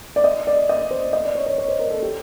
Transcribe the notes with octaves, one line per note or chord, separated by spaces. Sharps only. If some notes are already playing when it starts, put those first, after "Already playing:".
D5
D#5
D5
D#5
C5
D#5
D5
C#5
C#5
C#5
C5
A#4
A4
G4